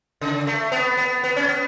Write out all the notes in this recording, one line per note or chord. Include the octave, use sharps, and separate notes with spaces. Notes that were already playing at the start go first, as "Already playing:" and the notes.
C#3
A3
B3
B3
B3
C#4
B3